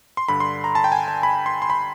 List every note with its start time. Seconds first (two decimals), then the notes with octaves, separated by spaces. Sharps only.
0.17 C6
0.29 G2 D3 B5
0.40 C6
0.64 A#5
0.75 A5
0.84 G5
0.92 G#5
1.08 A5
1.23 B5
1.46 C6
1.62 C6
1.70 B5